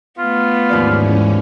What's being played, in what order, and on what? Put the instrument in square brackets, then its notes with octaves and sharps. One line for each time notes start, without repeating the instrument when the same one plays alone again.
[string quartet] A3 B3 [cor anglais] F4
[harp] D#2 F3 D5 [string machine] G#2 E3 C#4